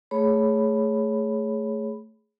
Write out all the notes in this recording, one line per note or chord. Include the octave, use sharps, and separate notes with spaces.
A3 G#4 C#5 B5